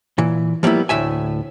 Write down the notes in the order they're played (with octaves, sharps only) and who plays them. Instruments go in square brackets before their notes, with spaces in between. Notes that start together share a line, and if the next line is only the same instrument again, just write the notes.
[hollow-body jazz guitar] A#2 E3
F3 G3 A#3 B3 E4
D2 A2 E5 G#5